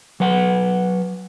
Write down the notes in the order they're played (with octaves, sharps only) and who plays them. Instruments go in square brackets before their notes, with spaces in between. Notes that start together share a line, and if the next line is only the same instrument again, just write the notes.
[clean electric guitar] F#3 B4 F#5